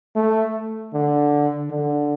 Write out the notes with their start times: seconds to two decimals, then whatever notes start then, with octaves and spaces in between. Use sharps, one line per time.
0.16 A3
0.94 D3
1.71 D3